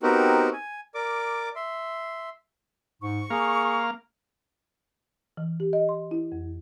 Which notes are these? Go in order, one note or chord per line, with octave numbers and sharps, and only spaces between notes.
B3 C4 D#4 F#4 G4 A#4
G#5
A#4 D5 D6
E5 C6
G#2 C#6
A#3 G#4 F5
E3
G4
D#5
C6
E4
F2